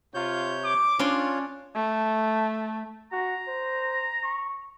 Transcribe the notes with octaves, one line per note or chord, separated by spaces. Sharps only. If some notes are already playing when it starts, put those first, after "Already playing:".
C3 F4 C#5 G6
D6
C#4 D4 F4 C#5 C6
A3
F#4 A#5
C5
C#6